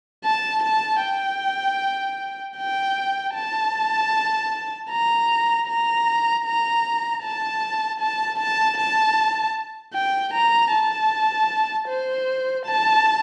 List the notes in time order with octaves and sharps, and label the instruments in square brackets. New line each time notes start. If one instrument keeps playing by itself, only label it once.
[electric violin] A5
A5
G5
G5
A5
A#5
A#5
A#5
A5
A5
A5
A5
G5
A#5
A5
C5
A5